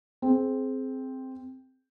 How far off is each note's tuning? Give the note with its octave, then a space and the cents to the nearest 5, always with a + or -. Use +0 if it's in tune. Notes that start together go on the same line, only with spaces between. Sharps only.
C4 +0 G#4 +25